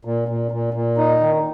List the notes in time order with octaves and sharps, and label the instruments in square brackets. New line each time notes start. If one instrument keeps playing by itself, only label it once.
[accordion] A#2
A#2
A#2
A#2
D#4
D#3